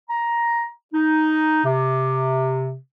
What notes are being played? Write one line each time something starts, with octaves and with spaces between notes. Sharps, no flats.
A#5
D#4
C3